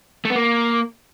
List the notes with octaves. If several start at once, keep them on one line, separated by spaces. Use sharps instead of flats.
A3
B3
A#3